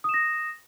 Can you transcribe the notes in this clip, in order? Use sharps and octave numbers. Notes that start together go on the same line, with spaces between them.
D#6 A#6 E7